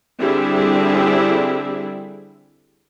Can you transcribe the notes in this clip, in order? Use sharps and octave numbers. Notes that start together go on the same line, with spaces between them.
D3 G3 C4 D4 E4 G#4